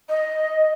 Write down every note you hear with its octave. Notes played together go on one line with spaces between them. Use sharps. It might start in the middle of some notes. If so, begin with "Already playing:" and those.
D#5